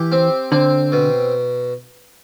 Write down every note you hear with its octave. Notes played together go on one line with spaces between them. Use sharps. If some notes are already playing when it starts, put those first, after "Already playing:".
Already playing: E3 G4
C4
D3 C4
B2